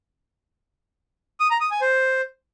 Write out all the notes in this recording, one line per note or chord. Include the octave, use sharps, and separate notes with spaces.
D#6
A#5
D#6
G#5
C5